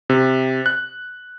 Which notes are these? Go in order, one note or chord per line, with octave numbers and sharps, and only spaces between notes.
C3
F#6